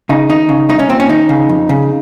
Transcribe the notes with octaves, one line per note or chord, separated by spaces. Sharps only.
C#3 D#4
D#2 D#4
C#3
C2 D#4
C#4
A#2 C4
C#4
D#2 D#4
C#3
F2
C#3